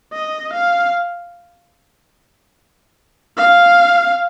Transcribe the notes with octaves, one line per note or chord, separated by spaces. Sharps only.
D#5
F5
F5